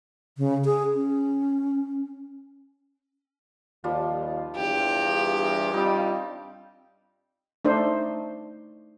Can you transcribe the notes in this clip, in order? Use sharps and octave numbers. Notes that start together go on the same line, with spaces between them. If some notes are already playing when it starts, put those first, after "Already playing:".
C#3
G#4
C#4
D#2 F3 G3 F4
E2 G2 G4
G2 G3 C4 D#4 F4 F5
A3 D4 D#4 C5